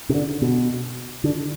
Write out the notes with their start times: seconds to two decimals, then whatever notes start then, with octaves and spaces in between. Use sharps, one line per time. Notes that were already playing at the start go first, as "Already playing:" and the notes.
0.09 C3
0.14 D3
0.42 B2
1.24 D3